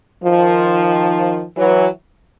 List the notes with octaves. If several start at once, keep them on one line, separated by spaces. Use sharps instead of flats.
D#3 F3
E3 F#3